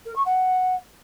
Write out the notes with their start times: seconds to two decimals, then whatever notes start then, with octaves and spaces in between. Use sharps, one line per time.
0.05 A#4
0.15 C#6
0.25 F#5